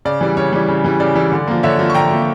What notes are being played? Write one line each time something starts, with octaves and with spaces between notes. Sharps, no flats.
C#3 D5
E3 G3
C#3 C#5
E3 G3
C#3
E3 G3
C#3 D5
E3 G3
D3
F3 A#3
D3 C#5 E5
F3 A#3
C#6
D3 G5 A#5
F3 A#3